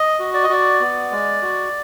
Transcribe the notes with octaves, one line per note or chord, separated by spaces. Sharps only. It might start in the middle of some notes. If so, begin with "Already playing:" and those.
Already playing: D#5
F#4
D5
D#5
F#4 D5
B3
G#3
F#4